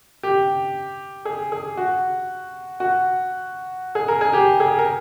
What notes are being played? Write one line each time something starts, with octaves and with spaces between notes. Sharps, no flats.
G4
G#4
G#4
F#4
F#4
G#4
A#4
G#4
G4
G#4
A#4